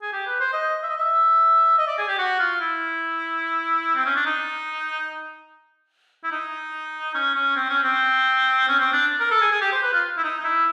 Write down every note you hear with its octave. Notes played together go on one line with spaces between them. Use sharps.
G#4
G4
B4
C5
D#5
E5
D#5
E5
D#5
D5
G#4
G4
F#4
F4
E4
C4
C#4
D4
D#4
E4
D#4
C#4
C#4
C4
C#4
C4
C#4
C4
D4
A#4
A4
G#4
G#4
G4
C5
B4
F4
E4
D#4
D#4
E4